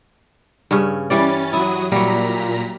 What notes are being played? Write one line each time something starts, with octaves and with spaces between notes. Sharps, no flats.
G2 C#3 C#4
E3 G3 C#4 D5 A6
F#3 E4 D#6
A#2 F#3 G3 A#5 B6